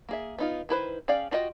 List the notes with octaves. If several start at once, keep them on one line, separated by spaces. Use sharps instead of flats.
A#3 G#4 E5
B3 D#4 F4
D#3 E4 B4 C5
C#4 G#4 D5 F5 G5
D4 F4 F#4 D#5 G5